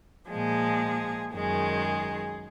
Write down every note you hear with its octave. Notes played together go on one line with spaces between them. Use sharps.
A#2 F3 G#3 G#4
F#2 D#3 G#3 G#4